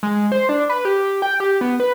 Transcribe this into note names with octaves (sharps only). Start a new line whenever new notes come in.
G#3
C5
D4
B4
G4
G5
G4
B3
B4